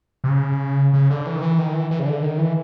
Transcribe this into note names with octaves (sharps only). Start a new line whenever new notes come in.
C3
C#3
C#3
D3
E3
D#3
E3
D#3
E3
E3
C#3
D3
D#3
E3